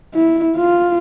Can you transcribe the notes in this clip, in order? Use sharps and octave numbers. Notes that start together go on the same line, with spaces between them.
E4
F4